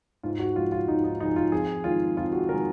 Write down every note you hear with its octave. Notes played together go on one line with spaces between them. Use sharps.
G#2 F4
F#4
F3 G#3 F4
F4
G#2 D#4
D#4
F3 G#3 D#4
F4
F2 G#4
D#3 G#3 F4
F2 F4
F#4
D#3 G#3 A#4